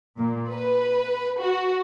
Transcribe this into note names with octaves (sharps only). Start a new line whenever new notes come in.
A#2
B4
F#4